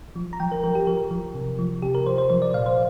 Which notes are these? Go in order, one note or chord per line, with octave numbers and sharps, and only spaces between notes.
F3
A#5
F3 G5
A#4
F3 A#4
G4
F3 A#4
F3
C3
F3
C3 G4
A#4
F3 C5
C5
F3 C5
D5
A#2 F5
C5